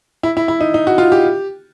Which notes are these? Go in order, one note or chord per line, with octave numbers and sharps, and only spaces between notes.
E4
E4
E4
D#4
D#4
F#4
F4
G4